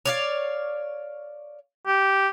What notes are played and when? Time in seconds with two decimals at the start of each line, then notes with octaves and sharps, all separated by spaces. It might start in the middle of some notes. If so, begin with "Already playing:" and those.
0.06 C#5 D5 F5
1.87 G4